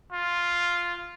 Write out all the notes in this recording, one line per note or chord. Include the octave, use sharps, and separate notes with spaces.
F4